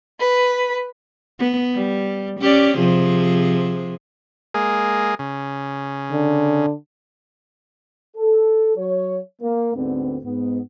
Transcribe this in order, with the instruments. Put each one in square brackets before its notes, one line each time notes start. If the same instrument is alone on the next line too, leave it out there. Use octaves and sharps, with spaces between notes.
[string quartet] B4
[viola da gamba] B3
G3
C#4 G4 D5
C3 F3 G#4
[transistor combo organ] G#3 A#3 G#4
C#3
[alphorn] D3
[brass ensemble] A4
F#3 C#5
A#3
D2 G#2 D3 B3 C4
G#2 B3